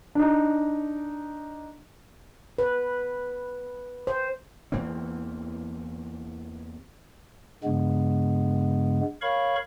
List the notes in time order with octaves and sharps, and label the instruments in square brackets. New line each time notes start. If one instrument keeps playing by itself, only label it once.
[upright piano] D4 D#4
[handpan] B4
C5
[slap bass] E2 E3 A#3 C4
[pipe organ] G2 C#3 G#3 B3
A#4 C#5 F5 B5 C#6